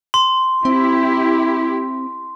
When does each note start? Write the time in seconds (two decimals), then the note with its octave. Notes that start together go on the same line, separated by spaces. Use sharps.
0.14 C6
0.65 C4 E4 G4